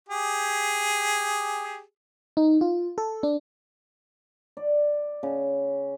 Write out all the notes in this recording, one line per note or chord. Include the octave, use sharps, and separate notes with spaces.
G4 G#4
D#4
F4
A4
D4
D5
C#3